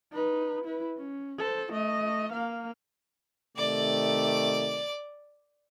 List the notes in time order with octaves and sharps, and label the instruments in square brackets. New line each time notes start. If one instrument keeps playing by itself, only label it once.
[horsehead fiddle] D#4 B4
E4 B4
C#4
A4 C5
A3 D#5
A#3 F5
[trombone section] C3 D#3 A3 [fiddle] D5 D6